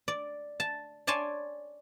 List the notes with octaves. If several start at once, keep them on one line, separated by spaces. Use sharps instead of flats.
D5
A5
C#5 D5 G#5 A5 C6